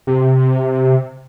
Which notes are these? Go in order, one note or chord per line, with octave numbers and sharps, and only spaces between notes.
C3